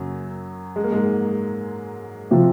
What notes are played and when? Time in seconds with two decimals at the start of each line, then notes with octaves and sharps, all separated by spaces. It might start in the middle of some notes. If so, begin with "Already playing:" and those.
Already playing: F#2 C#3 F#3 A#3
0.76 G#3
0.84 A#3
0.92 G#2 G#3
2.31 C3 F3 C4 F4